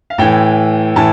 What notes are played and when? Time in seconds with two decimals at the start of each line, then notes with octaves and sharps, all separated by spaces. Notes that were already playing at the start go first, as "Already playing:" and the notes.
0.10 F5
0.18 A2 E3 G5
0.96 A2 E3 A5